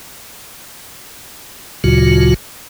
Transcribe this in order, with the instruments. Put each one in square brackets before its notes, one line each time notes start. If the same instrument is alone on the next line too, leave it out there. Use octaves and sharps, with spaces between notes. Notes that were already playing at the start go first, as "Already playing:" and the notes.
[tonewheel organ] D2 A#2 C#3 F#3 F4 F#4